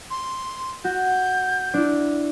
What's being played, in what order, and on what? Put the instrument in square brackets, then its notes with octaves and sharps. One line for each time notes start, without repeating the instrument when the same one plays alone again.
[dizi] C6
[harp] F#4 [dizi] G6
[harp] D4 E4